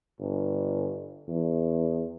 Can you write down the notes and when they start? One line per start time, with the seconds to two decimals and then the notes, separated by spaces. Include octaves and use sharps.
0.20 G1
1.28 E2